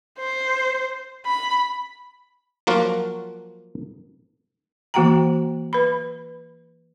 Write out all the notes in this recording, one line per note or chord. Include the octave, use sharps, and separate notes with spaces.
C5
B5
F3 F#3 A#3 F4 F#4
E3 A#3 F#4 F#5 G5 A#5
B4 B5